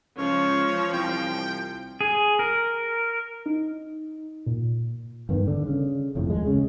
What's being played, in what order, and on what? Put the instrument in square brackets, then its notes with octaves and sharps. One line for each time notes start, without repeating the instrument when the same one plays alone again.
[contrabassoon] C#2 [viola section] F3 [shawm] C#5
[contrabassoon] C2 [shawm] G5
[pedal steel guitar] G#4
A#4
[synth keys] D#4
A#2
[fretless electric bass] G2 D#3 B3
D3
C#3
F#1 F2 A2
D#2 G#3
C#3